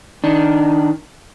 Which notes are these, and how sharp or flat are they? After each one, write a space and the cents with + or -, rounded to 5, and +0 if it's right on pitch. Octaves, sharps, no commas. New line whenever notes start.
D#3 +0 D4 +0